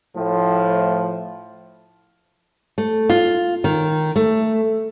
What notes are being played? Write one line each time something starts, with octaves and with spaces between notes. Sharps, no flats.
A2 F3
A3
F4
D#3
A3